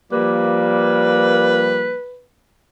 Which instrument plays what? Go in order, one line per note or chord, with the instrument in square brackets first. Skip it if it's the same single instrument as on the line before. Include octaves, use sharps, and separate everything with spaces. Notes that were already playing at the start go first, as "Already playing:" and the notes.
[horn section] F3 G3 A#3 [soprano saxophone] B4